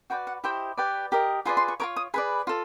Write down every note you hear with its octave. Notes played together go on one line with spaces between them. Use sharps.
F#4 B4 D5 G5
F#5
E4 G4 C5 D#5 G5
G4 B4 D5
G4 A#4 D#5
F4 G#4 B4 D5 C6
C6
C#6
F4 A#4 C#5 D6
D#6
G#4 B4 D5 B5
F4 A4